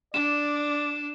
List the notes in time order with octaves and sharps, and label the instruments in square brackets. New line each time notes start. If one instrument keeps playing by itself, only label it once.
[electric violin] D4 [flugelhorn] D5 [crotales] E7